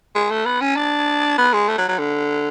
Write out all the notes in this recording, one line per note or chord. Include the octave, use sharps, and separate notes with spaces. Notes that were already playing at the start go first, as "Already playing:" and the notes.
G#3
A3
B3
C#4
D4
B3
G#3
A3
F#3
F#3
D3